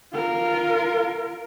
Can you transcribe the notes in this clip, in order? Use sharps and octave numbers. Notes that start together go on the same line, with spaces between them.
F4 A#4